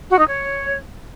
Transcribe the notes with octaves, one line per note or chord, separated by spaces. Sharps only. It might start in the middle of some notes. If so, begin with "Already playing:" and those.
F#4
D#4
C#5